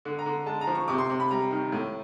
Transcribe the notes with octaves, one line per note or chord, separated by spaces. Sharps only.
D3
A#5
D3
G#3 A5
A#5
F3
C#6
C3 D6
C6
C3
B5
G3 A#5
D#3
A2